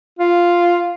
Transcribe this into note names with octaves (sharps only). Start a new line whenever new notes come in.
F4